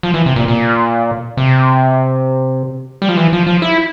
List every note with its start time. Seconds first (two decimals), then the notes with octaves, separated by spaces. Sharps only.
0.03 F3
0.14 E3
0.26 C3
0.36 A#2
0.48 A#2
1.37 C3
3.02 G3
3.09 F3
3.17 E3
3.33 F3
3.47 F3
3.62 E4